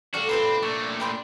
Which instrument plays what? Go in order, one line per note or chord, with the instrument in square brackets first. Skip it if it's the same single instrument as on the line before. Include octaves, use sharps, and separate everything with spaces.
[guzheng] C3 G3 A3 [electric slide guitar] D4 [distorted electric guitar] F#4 [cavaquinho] F5
[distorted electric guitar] C4 [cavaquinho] F4 B4 B5 [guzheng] A4
[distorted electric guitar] A#2 A3 [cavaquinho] C#6
[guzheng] C#5 D5 G#5 [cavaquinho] G5 B5 C6